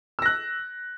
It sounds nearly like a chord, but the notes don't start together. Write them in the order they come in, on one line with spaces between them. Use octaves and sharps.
E6 A#6 F#6